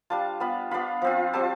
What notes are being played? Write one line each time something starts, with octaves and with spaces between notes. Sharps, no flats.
G3 D4 F4 A5
G3 B3 F4 B5
B3 D4 F4 B5
F3 C4 F4
G3 C4 F4 A5